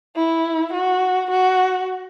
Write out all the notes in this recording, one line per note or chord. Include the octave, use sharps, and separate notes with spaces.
E4
F#4
F#4